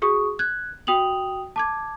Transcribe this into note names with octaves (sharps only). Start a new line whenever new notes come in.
F#4 G#4 C#6 D#6
F#6 G#6
F#4 G5 D#6 F7 F#7
A5 D6 G#6